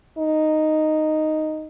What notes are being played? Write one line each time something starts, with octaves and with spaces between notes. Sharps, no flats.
D#4